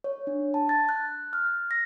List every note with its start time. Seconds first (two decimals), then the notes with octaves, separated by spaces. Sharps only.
0.04 C#5
0.27 D4
0.54 A5
0.69 A6
0.89 F#6
1.33 F6
1.71 A#6